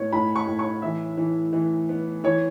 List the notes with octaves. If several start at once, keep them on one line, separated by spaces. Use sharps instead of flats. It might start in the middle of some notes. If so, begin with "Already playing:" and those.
Already playing: A2 B3 C#5
A2 B5
C#6
A2
C#6
E3 E5
E3
E3
B3
E3 C#5